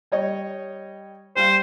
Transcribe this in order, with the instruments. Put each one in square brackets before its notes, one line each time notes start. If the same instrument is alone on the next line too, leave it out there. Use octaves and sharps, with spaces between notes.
[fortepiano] G3 C#5 D#5
[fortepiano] G3 F5 [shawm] C5